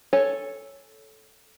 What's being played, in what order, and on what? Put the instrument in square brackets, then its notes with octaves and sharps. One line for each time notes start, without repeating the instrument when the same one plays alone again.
[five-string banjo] A4 C#5 G#5